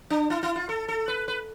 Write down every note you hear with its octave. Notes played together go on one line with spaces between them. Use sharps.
D4
E4
E4
F4
A4
A4
B4
B4